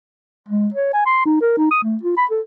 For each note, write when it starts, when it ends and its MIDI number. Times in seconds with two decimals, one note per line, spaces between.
0.48 0.68 56
0.74 0.92 73
0.93 1.06 80
1.06 1.23 84
1.26 1.37 63
1.41 1.56 70
1.57 1.68 63
1.71 1.79 87
1.84 1.97 57
2.03 2.16 65
2.17 2.26 83
2.31 2.41 69